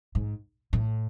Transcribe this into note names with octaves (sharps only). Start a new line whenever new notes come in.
G#2
A2